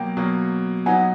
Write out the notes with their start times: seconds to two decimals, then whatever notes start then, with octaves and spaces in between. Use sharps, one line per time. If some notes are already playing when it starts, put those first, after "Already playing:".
Already playing: B2 F#3 A#3 G5
0.17 B2 F#3 A#3
0.86 F#3 B3 D#4 F#5 G#5